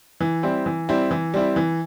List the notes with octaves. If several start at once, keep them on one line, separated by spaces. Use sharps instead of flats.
E3
G3 C4 E4
E3
G3 C4 E4
E3
G3 C4 E4
E3